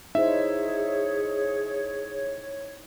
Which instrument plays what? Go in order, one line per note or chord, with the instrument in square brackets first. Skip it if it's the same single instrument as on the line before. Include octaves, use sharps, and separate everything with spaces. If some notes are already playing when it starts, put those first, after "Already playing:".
[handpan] D#4 E4 C5 [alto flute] G#4 [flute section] C#5 [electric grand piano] E5